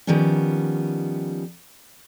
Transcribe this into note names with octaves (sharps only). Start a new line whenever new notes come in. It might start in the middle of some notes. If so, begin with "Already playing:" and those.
D#3 F3 G3 B3 C#4